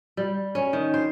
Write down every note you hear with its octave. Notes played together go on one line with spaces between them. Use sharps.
G3
C#4
D#3
C5